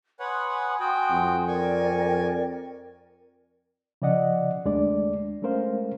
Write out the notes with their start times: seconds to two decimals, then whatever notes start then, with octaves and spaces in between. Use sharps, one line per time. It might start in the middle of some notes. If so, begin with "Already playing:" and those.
0.20 B4 C#5 F#5 G#5 C6 D#6
0.80 F#4 G5
1.11 F2
1.48 A#4 D5 G5 G#5 C#6
4.02 C#3 F3 D5 D#5 F#5
4.65 D#2 G#3 A3 D4 D5
5.42 G#3 A3 C#4 A#4 C5 F5